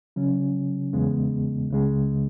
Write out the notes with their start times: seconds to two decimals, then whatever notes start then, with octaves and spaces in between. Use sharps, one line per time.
0.16 C#3 F#3 C#4
0.93 E2 C#3 G#3 B3
1.70 C#2 C#3 G#3